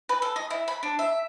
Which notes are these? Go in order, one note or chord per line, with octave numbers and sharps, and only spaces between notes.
B4
A4
D#5
E4
B5
D4
E5